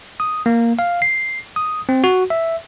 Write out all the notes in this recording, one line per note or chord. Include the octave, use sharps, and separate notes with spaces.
D#6
A#3
F5
C7
D#6
C4
F#4
E5